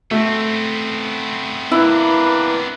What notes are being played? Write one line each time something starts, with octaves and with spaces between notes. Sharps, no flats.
A3 B3 C4
A#3 D4 E4 B4